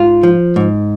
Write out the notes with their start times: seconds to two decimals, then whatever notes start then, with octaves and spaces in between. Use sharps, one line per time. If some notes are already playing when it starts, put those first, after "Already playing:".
Already playing: G#2 F4
0.23 F3
0.56 G#2